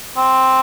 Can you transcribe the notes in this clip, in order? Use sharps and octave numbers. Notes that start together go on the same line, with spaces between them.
C4